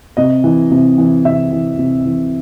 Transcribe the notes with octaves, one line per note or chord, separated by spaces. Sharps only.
C3 D#5
E3
C3
E3
C3 E5
E3
C3
E3